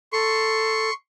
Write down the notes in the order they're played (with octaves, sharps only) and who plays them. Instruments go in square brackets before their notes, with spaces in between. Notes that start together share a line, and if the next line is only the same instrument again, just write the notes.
[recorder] A4 [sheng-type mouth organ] C6 C#6